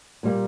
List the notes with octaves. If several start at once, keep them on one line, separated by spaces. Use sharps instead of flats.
A#2 G3 A#3